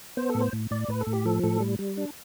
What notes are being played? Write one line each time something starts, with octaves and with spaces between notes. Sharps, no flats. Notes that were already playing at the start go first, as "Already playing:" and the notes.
B3 C5
A4
A2
C5
A2
A2 D5
A2 B4
A4
A2
G4
F3 A4
A2 A4
G3
G3
D4